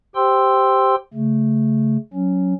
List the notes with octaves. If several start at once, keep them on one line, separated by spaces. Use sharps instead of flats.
G4 C5 G5 C6 E6
C#3 A3
F#3 C#4